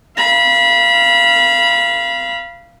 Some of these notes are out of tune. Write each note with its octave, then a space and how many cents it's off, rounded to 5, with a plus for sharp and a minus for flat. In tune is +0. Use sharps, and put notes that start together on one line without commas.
F5 -20 B5 -25